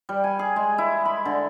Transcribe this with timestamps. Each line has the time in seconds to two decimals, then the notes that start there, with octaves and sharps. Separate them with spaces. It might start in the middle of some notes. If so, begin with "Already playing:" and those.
0.09 G3
0.24 G#5
0.39 G#4
0.56 G#3
0.78 E4
1.05 B5
1.25 D3